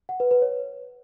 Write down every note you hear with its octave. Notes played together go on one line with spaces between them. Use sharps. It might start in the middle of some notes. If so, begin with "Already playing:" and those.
F#5
B4
B4
C#5